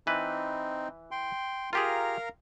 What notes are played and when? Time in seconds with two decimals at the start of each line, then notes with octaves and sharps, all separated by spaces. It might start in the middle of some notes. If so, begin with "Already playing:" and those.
0.07 E3 C4 D#4 B4
1.11 G5 C6
1.73 F4 G4 G#4 A#4 F5 A#5